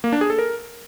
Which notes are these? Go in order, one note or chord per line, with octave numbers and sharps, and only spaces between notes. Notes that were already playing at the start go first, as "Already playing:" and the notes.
A#3
D4
G#4
A4
A#4